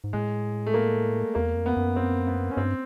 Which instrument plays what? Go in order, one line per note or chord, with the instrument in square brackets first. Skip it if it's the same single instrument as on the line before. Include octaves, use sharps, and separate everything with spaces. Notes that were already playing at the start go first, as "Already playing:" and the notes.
[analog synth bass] G#2
[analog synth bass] A2 [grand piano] G#3
[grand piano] A3
A#3
[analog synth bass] E2 [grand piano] A#3
[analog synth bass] F2
[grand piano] B3
[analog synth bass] F#2
[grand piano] C4
B3
C#4
[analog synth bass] G2 [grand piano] C4